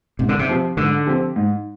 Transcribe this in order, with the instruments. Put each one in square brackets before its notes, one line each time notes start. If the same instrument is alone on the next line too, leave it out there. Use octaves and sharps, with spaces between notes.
[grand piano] G#2 [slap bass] C3
[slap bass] D3
C3
[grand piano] F3 C4 G4
[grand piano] G#2 [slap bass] D3
[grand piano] F3 C4 G4
G#2